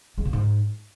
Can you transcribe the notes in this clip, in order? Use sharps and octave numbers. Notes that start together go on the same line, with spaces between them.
G#3
A#2
G#2